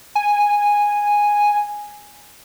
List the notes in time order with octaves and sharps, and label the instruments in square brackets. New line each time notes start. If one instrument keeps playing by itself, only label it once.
[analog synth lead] G#5